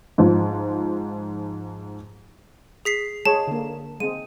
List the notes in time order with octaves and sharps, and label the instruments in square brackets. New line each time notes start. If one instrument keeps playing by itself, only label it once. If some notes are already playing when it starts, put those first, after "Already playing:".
[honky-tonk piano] G#2 F3
[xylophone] G#4 B6 C7
[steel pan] G#3 G#4 C#5 [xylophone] A5
[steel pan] D3 A#3
[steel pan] G#3 C4 [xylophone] D#7